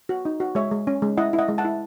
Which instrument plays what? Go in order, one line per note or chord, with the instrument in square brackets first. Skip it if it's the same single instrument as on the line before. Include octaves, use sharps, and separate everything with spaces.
[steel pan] F#4
D#4
F#4
G#3 C#5 E5
G#3
C#4
G#3
E4 D#5 F#5
E4
D#5 F#5
G#3
F#5 A5
E4